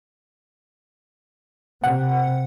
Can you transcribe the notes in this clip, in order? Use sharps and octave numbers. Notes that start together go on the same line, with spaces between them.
C3 F#5